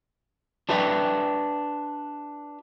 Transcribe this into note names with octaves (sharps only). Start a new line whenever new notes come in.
D4 F4 B4 E5 F5 G5